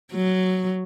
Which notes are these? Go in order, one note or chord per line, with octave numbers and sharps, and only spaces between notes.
F#3